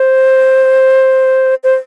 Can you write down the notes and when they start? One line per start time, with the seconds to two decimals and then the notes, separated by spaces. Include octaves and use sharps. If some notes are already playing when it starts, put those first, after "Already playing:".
Already playing: C5
1.64 C5